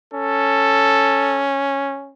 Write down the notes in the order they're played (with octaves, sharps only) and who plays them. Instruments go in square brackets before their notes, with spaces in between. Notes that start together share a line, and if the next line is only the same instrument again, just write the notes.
[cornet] C#4 [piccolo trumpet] A4